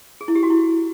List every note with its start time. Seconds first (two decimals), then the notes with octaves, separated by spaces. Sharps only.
0.21 G#4
0.28 E4
0.35 G4
0.43 F#4
0.50 E4